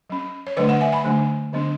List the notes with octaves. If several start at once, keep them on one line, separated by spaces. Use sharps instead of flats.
F#3 C#4
C#5
D3 F#3 A3 D4 B4 D5
D5 F#5
E5 G#5
G#5 B5
D3 F#3 A3 D4
D3 F#3 B3 D4